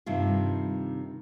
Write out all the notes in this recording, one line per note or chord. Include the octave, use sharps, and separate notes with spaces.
G2 C3 D#3 F4